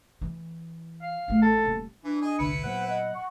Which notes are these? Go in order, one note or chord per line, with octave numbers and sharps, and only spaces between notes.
E3
F5
A1 A3
A4
D#1
E3 D4
G#4 D#5 G#5
G1 C2 D3 E4 B4 C#7
A#2 F#3 B3 C5 F#5
D#5 F#5
C#6